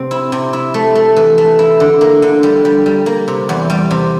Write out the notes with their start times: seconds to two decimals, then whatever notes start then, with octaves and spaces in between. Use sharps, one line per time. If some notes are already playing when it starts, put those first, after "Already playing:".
Already playing: C3 C4
0.11 E4
0.32 C3
0.53 E4
0.74 A3
0.95 A3
1.16 E3
1.38 A3
1.59 E4
1.80 D3
2.01 A#3
2.22 D3
2.43 G3
2.65 G3
2.86 G3
3.06 A#3
3.28 C3
3.49 E2
3.70 G3
3.91 C3